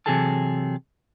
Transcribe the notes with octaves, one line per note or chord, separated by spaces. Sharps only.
C3 E3 F#3 G#4 A4 A5